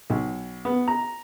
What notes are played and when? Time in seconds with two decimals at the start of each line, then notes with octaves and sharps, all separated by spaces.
0.10 B1
0.65 B3
0.88 A#5